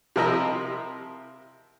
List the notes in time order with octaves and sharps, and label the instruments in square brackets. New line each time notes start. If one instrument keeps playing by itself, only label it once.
[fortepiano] C3 F3 E4 A#4 D#5 E5